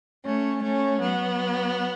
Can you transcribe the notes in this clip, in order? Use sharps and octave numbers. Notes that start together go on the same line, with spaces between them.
A3 C#4
A3 C#4
F#3 B3